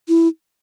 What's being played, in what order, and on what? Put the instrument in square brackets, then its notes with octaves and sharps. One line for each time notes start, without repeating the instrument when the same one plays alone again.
[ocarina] E4